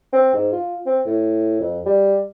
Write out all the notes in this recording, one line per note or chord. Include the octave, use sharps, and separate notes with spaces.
C4
G#2
F4
C4
A2
F2
G3